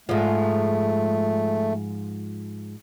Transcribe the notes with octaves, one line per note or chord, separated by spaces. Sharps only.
G#2 F3 A3